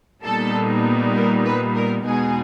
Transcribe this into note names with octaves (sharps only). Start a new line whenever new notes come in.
A#2 G3 B3 D#4 A4
A#4
B4
A#4
E2 B2 G#3 B3 D#4 G#4